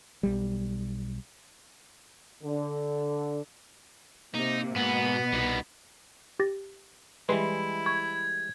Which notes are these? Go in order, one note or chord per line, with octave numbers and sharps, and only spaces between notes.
B1 G3
D3
C3 A#3 D#4
G#2 B2 B3
C2 G3 D#4
G4 A6 A#6
E3 G3 G#3 E4 B4 C6 C7
C#6 G#6